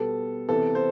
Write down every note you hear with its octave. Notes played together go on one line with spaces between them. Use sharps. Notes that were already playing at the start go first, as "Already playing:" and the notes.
Already playing: B2 G3 B3 A4
C3 E3 B3 A4
C5